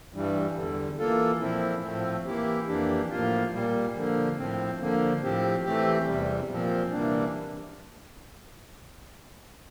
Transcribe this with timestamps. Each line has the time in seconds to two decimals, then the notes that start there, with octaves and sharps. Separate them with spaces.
0.13 G2 E3 G3
0.56 E2 D3 G3
0.98 E3 A#3 F4 A4
1.41 A#2 F3 C4 E4
1.83 A2 F3 A3 C4
2.26 E3 A#3 E4 G4
2.67 F2 E3 A#3 D4 G4
3.11 A2 F3 A#3 F4
3.52 A#2 G3 A#3
3.95 D3 F3 A#3
4.37 A2 F3 C4
4.79 D3 F3 A#3
5.21 A2 F3 C4 G4
5.64 E3 A3 C4 G4
6.06 E2 C3 G3
6.49 A#2 F3 C4
6.91 C3 E3 G3 A#3 D4